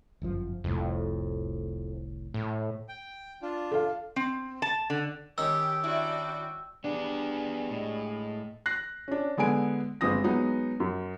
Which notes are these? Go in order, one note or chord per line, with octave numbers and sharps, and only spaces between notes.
G1 F#2 F3
F1 C2 F2 A2
A2
G5
D4 F4
A4 F5
C4
A5
D3
D#3 C#4 G4 E6
D4 E4 F#4 D5 G5
G3 B3 D4 G#4
A2 G#3
F#6 A#6 C7
C#4 D4
D3 G#3 B3 G#5 D7
G1 G#3 C4 D#6 A#6
F#3 G#3 B3 D#4
F#2